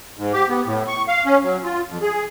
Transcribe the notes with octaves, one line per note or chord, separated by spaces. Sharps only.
G#2
G4
B3
A2
C#6
F5
C#4
F#3
F4
F2
G#4